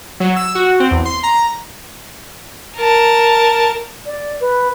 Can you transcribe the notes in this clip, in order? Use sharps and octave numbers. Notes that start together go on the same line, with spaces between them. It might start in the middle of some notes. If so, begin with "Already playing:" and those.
F#3
E6
F#4
C4
E2
C6
A#5
A#4 A5
D5
B4